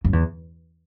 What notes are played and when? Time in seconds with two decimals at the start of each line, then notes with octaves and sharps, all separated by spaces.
0.05 F#2
0.13 E2